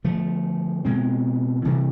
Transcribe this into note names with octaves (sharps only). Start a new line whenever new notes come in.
D3 F3 A3
B2 G#3 C4
C3 E3 G3